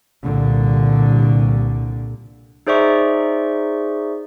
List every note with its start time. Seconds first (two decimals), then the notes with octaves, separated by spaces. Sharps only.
0.23 C2 A#2 D3
2.67 D#4 G#4 C5 D5 E5 C#6